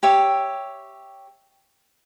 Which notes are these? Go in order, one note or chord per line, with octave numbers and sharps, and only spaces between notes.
G4 C#5 E5